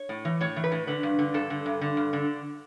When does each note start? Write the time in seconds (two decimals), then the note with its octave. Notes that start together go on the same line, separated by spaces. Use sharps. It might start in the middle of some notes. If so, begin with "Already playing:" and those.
Already playing: C#5
0.09 A2
0.25 E3
0.41 A2 C#5
0.56 E3
0.64 B4
0.72 A2
0.87 D3 B4
1.03 G2
1.19 D3
1.34 G2 A4
1.50 D3
1.66 G2
1.81 D3
1.97 G2
2.13 D3